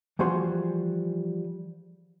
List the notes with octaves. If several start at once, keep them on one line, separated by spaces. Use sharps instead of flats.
E3 F3 G3 F#4 G#4 C6